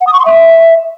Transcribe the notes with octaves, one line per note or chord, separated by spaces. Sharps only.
F#5
D#6
C#6
C6
E5